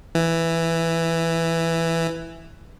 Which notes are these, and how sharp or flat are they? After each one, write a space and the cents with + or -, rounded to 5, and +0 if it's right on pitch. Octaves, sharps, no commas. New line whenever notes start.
E3 +5